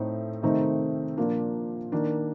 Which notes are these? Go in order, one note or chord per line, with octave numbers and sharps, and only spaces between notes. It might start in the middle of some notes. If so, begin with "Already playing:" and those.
Already playing: A2 A3 C4 D#4
C3 D#3 A3 C4 D#4
A#2 F3 A#3 D4
D#3 A#3 D4